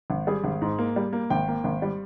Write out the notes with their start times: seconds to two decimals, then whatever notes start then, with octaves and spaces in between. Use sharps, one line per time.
0.10 G#1
0.27 G3 G#4
0.44 G#1
0.62 G#2
0.78 A#3
0.96 G3
1.13 A#3
1.30 G#1 G5
1.48 A#3
1.64 G#1
1.82 G3